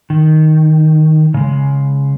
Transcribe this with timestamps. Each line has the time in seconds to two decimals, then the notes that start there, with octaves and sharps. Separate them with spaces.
0.10 D#3
1.34 C#3 G#3